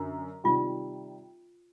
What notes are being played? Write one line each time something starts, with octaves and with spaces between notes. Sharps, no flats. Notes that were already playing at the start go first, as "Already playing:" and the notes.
Already playing: F#2 D3
C3 D#3 G3 F4